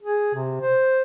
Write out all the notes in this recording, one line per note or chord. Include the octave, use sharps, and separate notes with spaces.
G#4
C3
C5